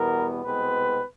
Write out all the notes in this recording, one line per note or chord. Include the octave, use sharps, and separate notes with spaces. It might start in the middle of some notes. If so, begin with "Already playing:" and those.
Already playing: E2 B2 G3 B3 A#4
C2 B2 G#3 C4 B4